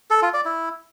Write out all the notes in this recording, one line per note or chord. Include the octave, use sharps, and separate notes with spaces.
A4
F4
D5
E4